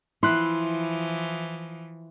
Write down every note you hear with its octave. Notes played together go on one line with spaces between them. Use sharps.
E3 F3 E4 C6 F#6